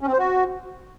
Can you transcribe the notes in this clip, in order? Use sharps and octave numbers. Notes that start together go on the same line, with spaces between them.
C#4
C4
C5
F#4